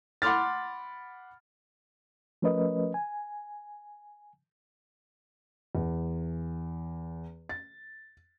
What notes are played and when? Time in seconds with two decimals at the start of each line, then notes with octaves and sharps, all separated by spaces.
0.22 F#5 B5 C6 D6 F6 A6
2.42 F3 A3 C#4 A#4 B4 D#5
2.94 G#5
5.75 E2
7.49 A6